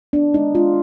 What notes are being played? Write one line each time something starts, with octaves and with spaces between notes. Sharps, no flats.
B3 D4
G#3 D#4
G#3 F4